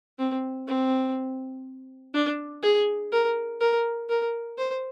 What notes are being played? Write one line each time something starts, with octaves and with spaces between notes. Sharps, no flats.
C4
C4
D4
G#4
A#4
A#4
A#4
C5